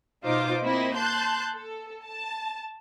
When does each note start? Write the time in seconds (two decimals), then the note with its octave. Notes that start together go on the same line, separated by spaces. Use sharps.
0.25 B2 D#4 F4 C5 D6
0.62 A#3 C4 E4 D#5
0.96 A5 C6 F#6 G6
1.53 A4
2.05 A5